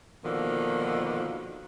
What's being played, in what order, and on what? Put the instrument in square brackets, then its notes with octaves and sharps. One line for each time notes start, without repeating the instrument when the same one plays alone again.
[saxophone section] B2 D3 D#3 F3 A#3